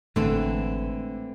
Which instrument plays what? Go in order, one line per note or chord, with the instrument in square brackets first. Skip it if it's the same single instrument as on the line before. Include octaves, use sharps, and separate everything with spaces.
[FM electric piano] G#1 [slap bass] A2 G#3 A3 [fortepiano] D3 [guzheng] E3 C4